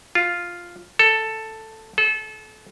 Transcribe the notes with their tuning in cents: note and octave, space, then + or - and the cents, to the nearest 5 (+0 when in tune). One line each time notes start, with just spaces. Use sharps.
F4 +0
A4 +5
A4 -30